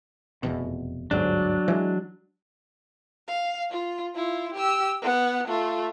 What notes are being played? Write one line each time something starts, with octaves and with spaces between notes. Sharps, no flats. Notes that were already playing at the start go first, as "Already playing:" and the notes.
F1 E2 B2
G1 D2 G#2 F#3 D4
E3 G#3
F5
F4
E4 F4
G4 E6
B3 F#5
A3 F4